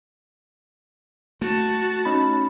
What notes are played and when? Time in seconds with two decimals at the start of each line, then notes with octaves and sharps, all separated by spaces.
1.42 A3 F#4 A5
2.05 C#4 D#4 B5